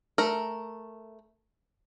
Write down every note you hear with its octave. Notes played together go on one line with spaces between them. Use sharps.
A3 A#4